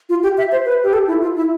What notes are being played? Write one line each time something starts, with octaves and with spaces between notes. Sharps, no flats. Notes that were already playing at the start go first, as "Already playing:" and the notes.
F4
G4
E5
C5
B4
G4
A4
E4
F4
E4